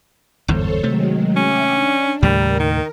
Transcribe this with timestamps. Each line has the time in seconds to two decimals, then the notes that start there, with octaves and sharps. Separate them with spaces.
0.48 G1 E2 G#2 A4 C5 C#5
0.83 C3 D#3 F#3 G#3 A3
1.36 C#4 E5 G5 D6
1.70 D4
2.23 D#2 A2 C#3 G3 A#4
2.60 D#3